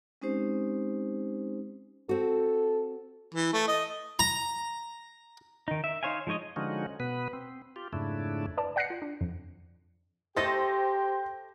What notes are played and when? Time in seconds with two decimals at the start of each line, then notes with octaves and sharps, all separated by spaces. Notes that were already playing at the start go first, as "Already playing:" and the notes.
0.22 G#3 C4 C#4 D#4 G4 C5
2.09 C4 F#4 A4
3.34 E3
3.53 A3
3.68 D#5
4.19 A#5
5.68 D#3 D#4
5.84 E5
6.03 D#4 C5 C#5 F5 G#5
6.27 F3 G#3 D#4 C#5 D#5
6.56 D3 F3 G#3 C#4 D#4 F#4
7.00 B2 B3 B4
7.33 C4
7.76 F4 G4
7.93 F2 G#2 C#3 A3 D4 E4
8.57 B4 D5 A5
8.76 D5 F#5 F#6 A#6 C7 C#7
8.90 F4
9.02 D4
9.21 F2
10.36 A3 G4 A4 C5 D#5 G5 A#6